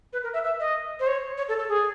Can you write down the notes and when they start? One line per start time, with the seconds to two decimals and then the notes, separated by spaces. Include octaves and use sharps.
0.13 B4
0.23 A#4
0.34 E5
0.44 E5
0.60 D#5
1.00 C5
1.07 C#5
1.38 C#5
1.48 A4
1.59 A4
1.69 G#4